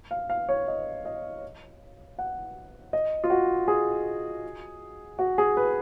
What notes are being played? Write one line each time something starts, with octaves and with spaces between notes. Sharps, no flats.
F5
F5
C#5
D#5
D#5
F#5
D#5
F4
F#4
G#4
F#4
G#4
B4